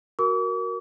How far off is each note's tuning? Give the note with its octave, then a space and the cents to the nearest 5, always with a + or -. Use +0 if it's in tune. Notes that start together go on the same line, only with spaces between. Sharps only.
F#4 +0 A#4 +0 D6 -45